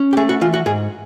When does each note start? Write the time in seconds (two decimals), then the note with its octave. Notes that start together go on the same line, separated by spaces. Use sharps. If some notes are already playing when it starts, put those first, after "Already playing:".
Already playing: C#4
0.13 G4
0.17 A3 G#4
0.29 F#4
0.41 E3 F4
0.54 F#4
0.66 G#2 G#4